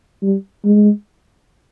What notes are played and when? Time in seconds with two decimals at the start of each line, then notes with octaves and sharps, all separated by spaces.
0.22 G3
0.65 G#3